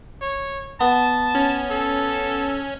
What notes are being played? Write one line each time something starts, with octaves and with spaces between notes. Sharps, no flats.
C#5
B3 A5
C#4
A4